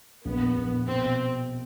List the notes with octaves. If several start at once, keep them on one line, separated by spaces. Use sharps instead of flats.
A#1 B3
A#1
B2 C4